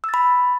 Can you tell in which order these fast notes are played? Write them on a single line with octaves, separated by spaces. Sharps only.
E6 A6 B5